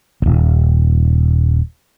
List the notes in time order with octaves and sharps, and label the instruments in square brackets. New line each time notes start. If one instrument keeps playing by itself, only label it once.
[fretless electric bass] D#1 G#1